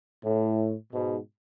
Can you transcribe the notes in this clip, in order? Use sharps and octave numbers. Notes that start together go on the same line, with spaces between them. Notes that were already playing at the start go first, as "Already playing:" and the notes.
A2
G#2 B2